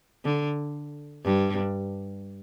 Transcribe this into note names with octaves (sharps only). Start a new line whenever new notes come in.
D3
G2